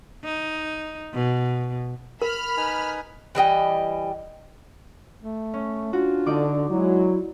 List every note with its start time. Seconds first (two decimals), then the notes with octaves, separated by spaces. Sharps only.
0.24 D#4
1.13 B2
2.22 A#4 B5 F6
2.57 D#4 B4 G#5
3.35 E3 G3 D#5 G5
5.22 A3
5.54 C#4
5.93 D4 F4 F#4
6.26 D3 D#4 D5 D6
6.70 F#3 G#3 E4